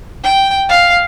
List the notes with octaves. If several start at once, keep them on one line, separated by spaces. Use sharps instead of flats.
G5
F5